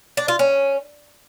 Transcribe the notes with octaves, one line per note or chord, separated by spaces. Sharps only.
D4
F4
C#4